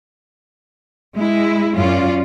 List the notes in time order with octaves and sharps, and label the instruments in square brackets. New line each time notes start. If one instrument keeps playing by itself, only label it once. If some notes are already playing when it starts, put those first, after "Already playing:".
[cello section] G#3 E4
F#2 C#4 F4 D5